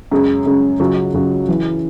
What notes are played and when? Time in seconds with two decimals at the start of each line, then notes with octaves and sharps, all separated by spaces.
0.11 F#2 C#3 G#3 C#4 G#4
0.46 F#2 C#3 G#3 C#4 G#4
0.80 C#2 C#3 F#3 C#4 F#4
1.14 C#2 C#3 F#3 C#4 F#4
1.48 F#2 C#3 E3